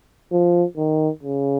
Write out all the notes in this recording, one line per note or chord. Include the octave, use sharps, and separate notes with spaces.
F3
D#3
C#3